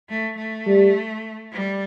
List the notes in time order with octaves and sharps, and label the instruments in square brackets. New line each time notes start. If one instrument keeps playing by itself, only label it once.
[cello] A3
A3
[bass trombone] G3
[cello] G3